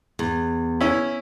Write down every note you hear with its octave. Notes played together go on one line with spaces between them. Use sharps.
E2
C#4 E4